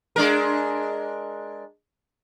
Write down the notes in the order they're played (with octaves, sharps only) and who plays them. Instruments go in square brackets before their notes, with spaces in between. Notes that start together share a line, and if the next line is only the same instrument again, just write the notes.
[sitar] G#3 D4 A#4